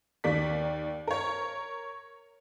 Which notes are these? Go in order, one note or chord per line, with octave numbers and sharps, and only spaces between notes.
D#2 A#3 G4 D5 B6
A#4 C#5